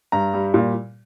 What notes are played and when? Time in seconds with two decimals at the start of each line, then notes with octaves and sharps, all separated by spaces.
0.12 G2 A#5
0.34 G3
0.54 A#2